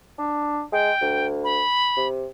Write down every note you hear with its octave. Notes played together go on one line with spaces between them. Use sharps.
D4
G#3 G5
D2
B5
C3